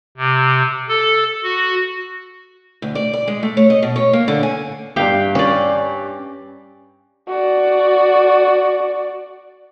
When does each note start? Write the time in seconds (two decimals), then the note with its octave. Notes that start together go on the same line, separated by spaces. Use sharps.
0.17 C3
0.89 A4
1.43 F#4
2.82 D2
2.95 D5
3.13 D5
3.27 G#3
3.43 A3
3.57 C#5
3.70 D#5
3.82 B2
3.96 C#5
4.13 A#3
4.28 D3
4.43 G#5
4.96 G2 G4 F5 G5
5.35 C#4 D5
7.29 F#4 D5